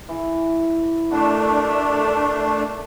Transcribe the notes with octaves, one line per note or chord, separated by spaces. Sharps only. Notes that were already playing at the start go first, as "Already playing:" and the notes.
E3
A3 D4 F#4 A#4 D#5